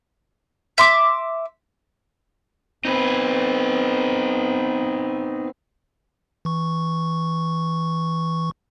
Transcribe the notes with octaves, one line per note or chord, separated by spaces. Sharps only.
E5 C6 D6
B3 C4 D#4 B4
E3 C#6